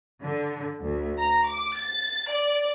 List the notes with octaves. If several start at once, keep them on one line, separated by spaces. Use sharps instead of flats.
D3
D2
A#5
D6
A6
D5